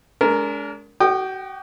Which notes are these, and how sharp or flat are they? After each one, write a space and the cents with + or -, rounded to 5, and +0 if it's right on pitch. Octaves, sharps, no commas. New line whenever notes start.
G#3 +20 D4 -40 A#4 +0
F#4 +40 G5 +0 D#6 -35